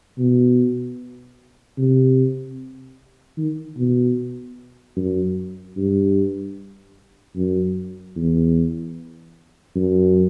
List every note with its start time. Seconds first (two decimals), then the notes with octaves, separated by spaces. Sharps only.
0.18 B2
1.78 C3
3.38 D#3
3.77 B2
4.97 F#2
5.77 G2
7.36 F#2
8.16 E2
9.76 F#2